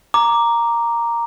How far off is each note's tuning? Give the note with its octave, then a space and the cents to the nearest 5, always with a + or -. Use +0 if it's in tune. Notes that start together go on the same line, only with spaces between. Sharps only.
A#5 +0 D6 +0